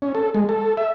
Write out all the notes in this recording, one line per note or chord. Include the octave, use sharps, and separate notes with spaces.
C#4
A4
G#3
A4
E5